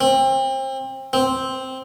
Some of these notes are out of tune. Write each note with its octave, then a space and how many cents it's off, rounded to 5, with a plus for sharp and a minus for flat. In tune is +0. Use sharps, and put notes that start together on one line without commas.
C4 +30
C4 +0